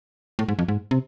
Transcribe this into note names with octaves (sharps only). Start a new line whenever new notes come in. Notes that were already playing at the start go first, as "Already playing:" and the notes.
A2
G#2
F2
G#2
C3